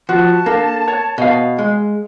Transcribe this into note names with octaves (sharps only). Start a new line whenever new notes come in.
F3 F#4 A5
A#3 D4 A4
C#5
B2 D#5 F5
G#3